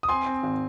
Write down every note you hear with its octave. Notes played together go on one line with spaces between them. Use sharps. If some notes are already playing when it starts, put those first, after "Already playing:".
D#6
C4 G#5 C6
C4
G#1